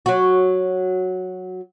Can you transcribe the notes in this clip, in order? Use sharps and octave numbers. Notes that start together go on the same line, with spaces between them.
F#3 F#4